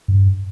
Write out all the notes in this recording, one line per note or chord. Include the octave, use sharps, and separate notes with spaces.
G2